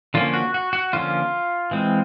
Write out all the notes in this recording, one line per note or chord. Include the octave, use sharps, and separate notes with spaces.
D3 F3 A#3 C#4 F4
F#4
F#4
F#4
D3 F3 A#3 C#4 F4
E3 G#3 C4